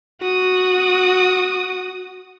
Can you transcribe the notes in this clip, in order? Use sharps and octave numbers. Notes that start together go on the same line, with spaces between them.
F#4 D#6